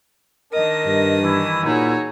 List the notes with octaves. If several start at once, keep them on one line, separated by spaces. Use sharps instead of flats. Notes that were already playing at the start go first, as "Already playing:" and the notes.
D#3 D4 A#4 D#5 D#6
G2
E3 E4
A#2 D#4 F#4 G#4 C#5